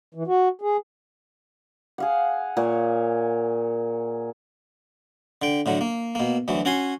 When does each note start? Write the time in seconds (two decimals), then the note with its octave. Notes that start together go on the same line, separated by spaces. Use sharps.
0.14 E3
0.27 F#4
0.61 G#4
1.98 G#4 F5 F#5
2.57 A#2 C#5
5.42 D3 G5
5.66 A2 D3 F#3
5.81 A#3
6.15 B2 A#3
6.48 D2 E3 F#3
6.65 C#4 F#4 C#5 G#5 C6